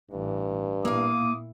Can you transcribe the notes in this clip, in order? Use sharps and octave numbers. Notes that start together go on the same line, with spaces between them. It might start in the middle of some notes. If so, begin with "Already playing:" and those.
A1 G2 E3
A#2 A#3 E4 F5 D6 D#6